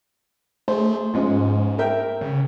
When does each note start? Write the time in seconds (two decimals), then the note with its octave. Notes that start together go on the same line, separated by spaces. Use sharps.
0.68 A3 G#4 C5
1.14 G#2 F3 G#3 C#4
1.78 A#4 E5 G5
2.21 C#3